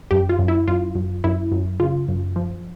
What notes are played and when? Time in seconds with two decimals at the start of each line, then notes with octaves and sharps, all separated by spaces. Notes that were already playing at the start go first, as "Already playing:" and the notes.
0.11 F#2 G4
0.29 F4
0.39 F#2
0.48 E4
0.68 F#2 F4
0.95 F#2
1.24 F#2 E4
1.52 F#2
1.80 C#3 F4
2.09 F#2
2.36 F3